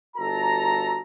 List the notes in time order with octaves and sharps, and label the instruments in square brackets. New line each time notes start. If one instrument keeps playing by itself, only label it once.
[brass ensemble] G1 F#4 A4 A#5